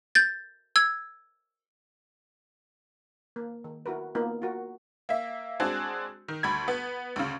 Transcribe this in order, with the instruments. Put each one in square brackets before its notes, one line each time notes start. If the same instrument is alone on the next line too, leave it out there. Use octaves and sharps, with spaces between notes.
[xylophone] G6 A6
E6 G#6
[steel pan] A#3
D#3
E4 F#4 A#4 B4
A#3 B3 D#4 F4
F4 F#4 A#4
[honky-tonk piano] A#3 E5
G#3 C4 D4 F#4 G#4
D#3
D2 B5 G#6
B3
D2 C#3